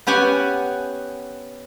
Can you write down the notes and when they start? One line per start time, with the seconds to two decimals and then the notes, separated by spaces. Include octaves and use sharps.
0.07 B3 C#4 G4 F#5 G#5